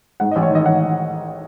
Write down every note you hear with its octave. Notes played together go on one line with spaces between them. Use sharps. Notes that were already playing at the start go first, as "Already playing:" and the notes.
G#2 F#5
A1 D#5
C#5
D#3 D#5
A1 F#5